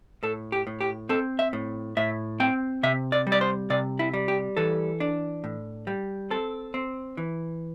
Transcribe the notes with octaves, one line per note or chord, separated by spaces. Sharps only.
A2 A4
G4
A2
G4
C4 A4
E5
A2
A2 E5
C4 G5
C3 E5
D5
G3
D5
C5
C3 D5
E4
G3
G4
E3 A4
D4
A2
G3
C4 A4
C4
E3